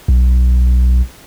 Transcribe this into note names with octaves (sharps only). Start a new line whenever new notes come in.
B1